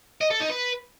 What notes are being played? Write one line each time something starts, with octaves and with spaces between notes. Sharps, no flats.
D#5
A4
D#4
B4